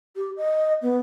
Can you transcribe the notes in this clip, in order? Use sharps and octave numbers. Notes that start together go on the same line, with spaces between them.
G4
D#5
B3